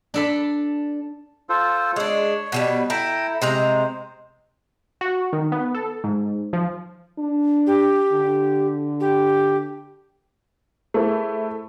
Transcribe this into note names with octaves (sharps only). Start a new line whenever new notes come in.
D4 A4 B5
F4 A4 C5
G#3 D4 C#5
B2 F#3 G3
E4 A4 G5 A#5
C3 G#3 C5 A#5
F#4
D#3
B3
A4
G#2
F3
D4
G4
D3
G4
A3 E4 G#4 A#4 C5